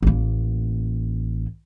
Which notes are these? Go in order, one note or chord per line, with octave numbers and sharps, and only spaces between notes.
A1 A#3